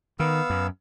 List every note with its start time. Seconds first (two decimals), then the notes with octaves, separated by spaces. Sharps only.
0.20 D#3 B3 F5 E6
0.50 F#2